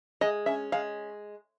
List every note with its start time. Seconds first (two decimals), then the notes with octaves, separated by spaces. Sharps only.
0.21 G#3 D#5
0.46 C#4 E5
0.72 G#3 F5